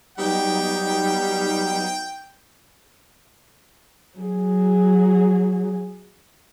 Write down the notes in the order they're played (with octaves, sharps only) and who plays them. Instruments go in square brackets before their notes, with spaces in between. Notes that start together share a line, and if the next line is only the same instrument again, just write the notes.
[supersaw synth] F#3 B3 D#4 [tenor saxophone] G3 [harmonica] G5
[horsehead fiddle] F#3 G#4